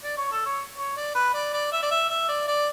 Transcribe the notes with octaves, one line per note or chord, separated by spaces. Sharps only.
D5
C#5
A4
C#5
C#5
D5
B4
D5
D5
E5
D5
E5
E5
D5
D5